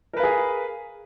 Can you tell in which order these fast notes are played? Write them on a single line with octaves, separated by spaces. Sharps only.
A#4 B4 F5 G#4